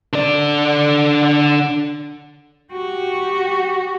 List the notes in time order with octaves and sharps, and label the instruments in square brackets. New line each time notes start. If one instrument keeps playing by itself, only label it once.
[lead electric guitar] D3 D5
[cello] F#4 G4